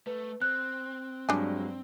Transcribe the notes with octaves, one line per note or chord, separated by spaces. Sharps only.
A3 B4
C4 F#6
G2 F#3 G#3 D4 G#5